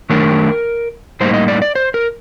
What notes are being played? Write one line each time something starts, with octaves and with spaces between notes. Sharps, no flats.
D#3 F#3 A3 D4 A#4
A2 G3 A#3 D#4 C5
D#5
D5
D5
C5
A#4